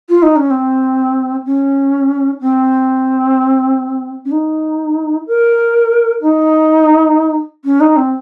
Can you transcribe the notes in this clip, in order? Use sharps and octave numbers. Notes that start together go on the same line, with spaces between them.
F4
D#4
C#4
C4
C#4
C4
C#4
D#4
A#4
D#4
C#4
D#4
C4